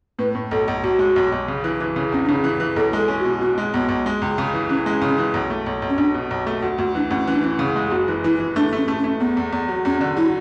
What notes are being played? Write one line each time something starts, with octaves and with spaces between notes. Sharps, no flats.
A2 B4
A2
B1 A4
B1
B1 F#4
G#3
B1
B1
C#3
E3
E3
C#3
E2 C#4
D4
C#3 C#4
E3
E3
B1 A4
G#3
A4
C#4
F#4
B2
B2 F#4
G#3
B1 B3
B1
G#3
C#2
C#3
E3
E3 C#4
G#3
C#3
E3
B1
A3
B1
B1
C#4
B1 D4
B2
B1
A3
D2 F#4
D2 F#4
E3 D4
D2 C#4
E3 C#4
D4
E3 C#4
C#3
G#3
G#4
F#1 F#4
E3
E3 E4
E3
A3 D4
A3 C#4
A3
C#4
A3
E2 B3
E2
E2
F#3
E2 C#4
D3
F#3 E4